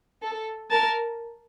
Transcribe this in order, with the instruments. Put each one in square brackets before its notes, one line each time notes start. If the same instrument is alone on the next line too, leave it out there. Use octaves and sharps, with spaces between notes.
[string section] A4
[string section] A#4 [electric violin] A5